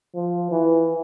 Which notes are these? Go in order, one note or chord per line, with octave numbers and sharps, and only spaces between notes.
F3
E3